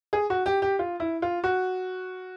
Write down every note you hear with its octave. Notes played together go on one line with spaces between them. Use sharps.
G#4
F#4
G4
G4
F4
E4
F4
F#4